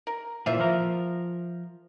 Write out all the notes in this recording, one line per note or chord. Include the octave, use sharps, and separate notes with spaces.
A#4
A#2 E3 F4 C5 E5
F3 A#4